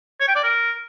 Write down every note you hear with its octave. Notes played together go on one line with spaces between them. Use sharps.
C#5
G5
D5
A#4